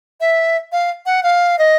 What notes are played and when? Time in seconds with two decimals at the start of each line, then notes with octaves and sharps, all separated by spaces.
0.21 E5
0.72 F5
1.06 F#5
1.23 F5
1.59 D#5